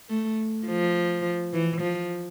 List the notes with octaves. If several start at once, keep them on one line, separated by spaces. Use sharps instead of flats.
A3
F3
E3
F3